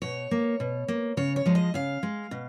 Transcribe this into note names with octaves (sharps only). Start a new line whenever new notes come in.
B2 C#5
A#3
B2
A#3
C#3 C#5
C#5
F3 G#3
D#5
C#3 F5
G#3
B2